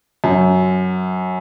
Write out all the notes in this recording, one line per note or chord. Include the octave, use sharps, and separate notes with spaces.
F#2